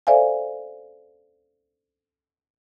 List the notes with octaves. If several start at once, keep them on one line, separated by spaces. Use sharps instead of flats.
A4 C5 D5 E5 F5 G#5